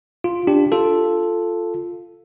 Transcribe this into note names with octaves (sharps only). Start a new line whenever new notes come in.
F4
D4 G4
F4 A4